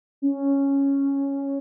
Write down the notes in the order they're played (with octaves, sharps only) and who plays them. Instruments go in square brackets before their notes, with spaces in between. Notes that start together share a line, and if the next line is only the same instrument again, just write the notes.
[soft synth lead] C#4